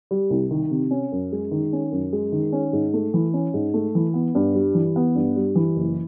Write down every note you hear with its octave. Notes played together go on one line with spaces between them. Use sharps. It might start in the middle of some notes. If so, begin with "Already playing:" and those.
G3
C2
D#3
C3
C#4
F#2
G#3
D#3
C#4
F#2
G#3
D#3
C#4
G#2
A3
E3
C#4
G#2
A3
E3
B3
G2
G3
E3
B3
G2
G3
E3
F#1